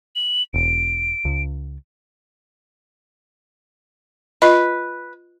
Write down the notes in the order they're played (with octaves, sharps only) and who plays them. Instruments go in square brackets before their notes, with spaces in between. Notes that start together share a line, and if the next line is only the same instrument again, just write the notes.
[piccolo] F#7
[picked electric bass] E1 [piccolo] D7
[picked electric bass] C#2
[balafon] F4 D#5 [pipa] B4